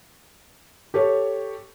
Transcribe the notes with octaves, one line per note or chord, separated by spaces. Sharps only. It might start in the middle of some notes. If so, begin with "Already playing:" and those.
G4 A4 C#5